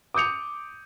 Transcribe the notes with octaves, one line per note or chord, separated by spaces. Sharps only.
D6 D#6 G6 C#7 F7